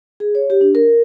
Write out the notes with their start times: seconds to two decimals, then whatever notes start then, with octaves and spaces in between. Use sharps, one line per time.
0.20 G#4
0.35 C#5
0.50 G4
0.61 D4
0.75 A#4